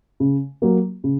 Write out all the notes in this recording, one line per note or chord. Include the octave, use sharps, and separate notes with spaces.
C#3
F#3 A#3
C#3